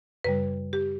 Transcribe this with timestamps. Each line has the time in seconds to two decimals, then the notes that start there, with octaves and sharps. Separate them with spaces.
0.24 F#2 C#3 G3 B4
0.73 G4